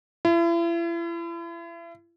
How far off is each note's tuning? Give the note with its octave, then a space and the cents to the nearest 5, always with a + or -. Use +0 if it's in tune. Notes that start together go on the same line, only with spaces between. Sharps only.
E4 +40